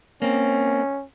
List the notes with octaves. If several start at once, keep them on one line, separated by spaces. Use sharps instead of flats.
A#3 C4 C#4